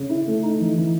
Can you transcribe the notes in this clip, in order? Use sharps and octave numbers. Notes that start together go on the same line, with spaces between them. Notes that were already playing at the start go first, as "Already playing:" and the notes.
Already playing: C#3
E4
A3
D#4
E3
E3